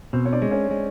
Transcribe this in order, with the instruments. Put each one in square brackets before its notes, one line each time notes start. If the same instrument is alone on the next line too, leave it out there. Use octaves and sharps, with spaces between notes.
[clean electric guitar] B2 [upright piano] C4 C5
[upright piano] C#5
D4 D5
[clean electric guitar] G#3
[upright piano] C#4 C#5
[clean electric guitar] G#3